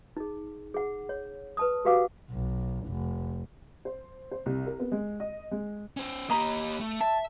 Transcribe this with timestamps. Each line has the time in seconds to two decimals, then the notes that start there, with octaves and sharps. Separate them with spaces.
0.17 D#4 G#4
0.74 G#4 F#5
1.09 C#5
1.57 B4 A5 D#6
1.85 F#4 G4 B4 F5 F#5 D6
2.31 B1
2.87 F1
3.85 C5
4.31 C5
4.46 C2
4.66 A#4
4.80 B3
4.92 G#3
5.20 D#5
5.51 G#3
5.97 C#4 C5
6.30 A#3 G4 D#5 A#5 B5
6.80 A3
7.00 E5 A5